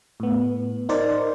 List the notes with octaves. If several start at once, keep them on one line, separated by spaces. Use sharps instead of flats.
A2 B3
D#4 A#4 C5 D5